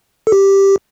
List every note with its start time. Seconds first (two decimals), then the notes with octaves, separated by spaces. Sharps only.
0.27 A4
0.32 G4